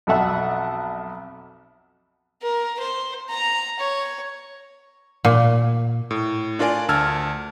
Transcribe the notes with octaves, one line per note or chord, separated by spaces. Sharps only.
B1 F2 A4 E5 F#5
A#4
C5
A#5
C#5
A#2
A2
D4 F4 A#4 D5 G#5
D2 A5 E6 F6 G#6